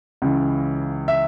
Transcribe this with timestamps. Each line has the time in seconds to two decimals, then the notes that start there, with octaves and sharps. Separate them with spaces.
0.22 C#2 C#3 E3
1.08 E5